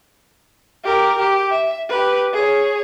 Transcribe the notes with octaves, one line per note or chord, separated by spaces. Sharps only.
G4 A#4
G4
E5
G4 B4
G#4 C#5